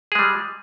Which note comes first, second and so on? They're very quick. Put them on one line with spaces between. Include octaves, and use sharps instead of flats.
G#4 G#3 G3